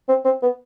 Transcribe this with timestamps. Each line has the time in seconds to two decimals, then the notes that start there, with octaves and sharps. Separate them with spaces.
0.09 C4
0.25 C4
0.42 B3